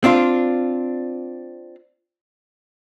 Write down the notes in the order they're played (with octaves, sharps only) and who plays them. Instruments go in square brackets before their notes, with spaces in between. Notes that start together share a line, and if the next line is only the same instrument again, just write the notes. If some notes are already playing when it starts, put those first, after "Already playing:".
[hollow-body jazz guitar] C4 D4 F4